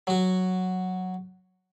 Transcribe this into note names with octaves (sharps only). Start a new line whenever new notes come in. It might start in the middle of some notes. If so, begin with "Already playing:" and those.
F#3 F#4